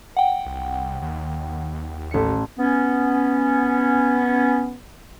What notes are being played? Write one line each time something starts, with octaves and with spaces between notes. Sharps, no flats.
F#5 G5
C2
D#2
A1 C#7
B3 C#4